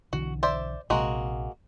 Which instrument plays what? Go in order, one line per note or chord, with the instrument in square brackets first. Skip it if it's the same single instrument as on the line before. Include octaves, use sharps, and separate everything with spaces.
[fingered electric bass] B1 D3 E3 [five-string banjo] F#4
[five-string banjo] C5 D5 E5
[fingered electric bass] A#1 C3 [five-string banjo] G#3 A#3 F#4